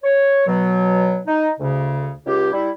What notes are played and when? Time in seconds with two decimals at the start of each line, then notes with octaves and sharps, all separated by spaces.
0.03 C#5
0.47 B2 F#3
1.27 D#4
1.59 D2 C#3
2.25 C#2 G4
2.52 G3 E4